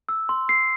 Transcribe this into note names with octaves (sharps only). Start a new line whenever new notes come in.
E6
C6
C7